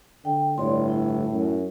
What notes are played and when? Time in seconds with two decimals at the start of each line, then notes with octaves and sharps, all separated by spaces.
0.25 D3 G5
0.58 G1 A2 C#5 D5 C6
0.89 E4
1.32 F#2